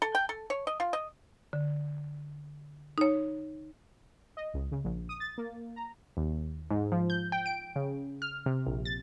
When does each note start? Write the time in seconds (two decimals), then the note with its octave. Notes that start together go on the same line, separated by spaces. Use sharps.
0.02 A4
0.15 G5
0.29 A4
0.50 C#5
0.67 D#5
0.80 F4
0.93 D#5
1.53 D3
2.98 D#4 C#5
4.37 D#5
4.54 C#2
4.71 C#3
4.84 A#1
5.09 D#6
5.20 A6
5.38 A#3
5.76 A#5
6.17 D#2
6.71 G#2
6.92 F3
7.10 G6
7.32 G5
7.46 D7
7.76 C#3
8.22 F6
8.46 C3
8.67 A#1
8.85 A6